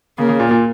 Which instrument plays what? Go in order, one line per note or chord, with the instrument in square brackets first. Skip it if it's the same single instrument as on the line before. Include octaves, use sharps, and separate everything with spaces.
[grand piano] C#3 [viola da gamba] A#3
[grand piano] C#3
A#2
A#2